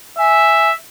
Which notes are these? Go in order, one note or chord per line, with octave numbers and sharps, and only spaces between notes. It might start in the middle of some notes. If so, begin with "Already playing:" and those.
E5 G#5